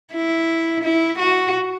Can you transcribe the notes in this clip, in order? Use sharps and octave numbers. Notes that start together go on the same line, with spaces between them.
E4
E4
F#4